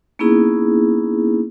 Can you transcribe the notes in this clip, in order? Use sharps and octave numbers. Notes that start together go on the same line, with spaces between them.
A#3 B3 C#4 D#4 E4 G#4